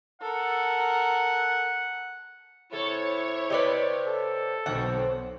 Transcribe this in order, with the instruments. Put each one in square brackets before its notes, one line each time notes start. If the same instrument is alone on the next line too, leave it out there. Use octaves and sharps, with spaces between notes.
[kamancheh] A4 A#4 [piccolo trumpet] F#5
[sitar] C3 A4 [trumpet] E4 [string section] C#5
[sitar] C3 G4 [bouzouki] B4 D5 D#5
[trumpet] A4
[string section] B1 [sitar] D3 F#3 C4 [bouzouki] F#5